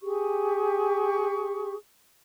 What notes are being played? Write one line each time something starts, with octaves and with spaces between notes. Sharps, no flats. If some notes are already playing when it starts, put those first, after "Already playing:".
G4 G#4 C#6